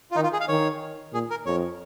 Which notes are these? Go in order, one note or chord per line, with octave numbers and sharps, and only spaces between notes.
F4
D#3 D#4
F4
G#4
F5
D#3 C#5
A#2 G#4
A#4
F2 C#5